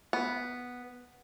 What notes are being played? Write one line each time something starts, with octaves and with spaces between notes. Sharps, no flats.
B3